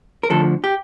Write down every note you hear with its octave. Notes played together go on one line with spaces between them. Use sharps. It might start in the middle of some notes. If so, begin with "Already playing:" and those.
A#4
D2 D3 F3 A4
G4